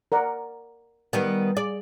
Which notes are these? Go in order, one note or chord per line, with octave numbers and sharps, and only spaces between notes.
A#4 D5 F#5
D#3 G3 B3
G#4 D5